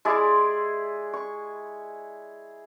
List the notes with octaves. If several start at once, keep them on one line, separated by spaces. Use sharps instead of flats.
G#3 E4 G#4 D5
C#6